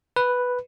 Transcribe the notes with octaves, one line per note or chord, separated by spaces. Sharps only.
B4